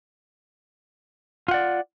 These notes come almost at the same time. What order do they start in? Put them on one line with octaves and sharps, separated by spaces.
F4 F#5 D5